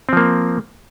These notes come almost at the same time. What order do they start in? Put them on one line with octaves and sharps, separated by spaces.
C4 F3 A#3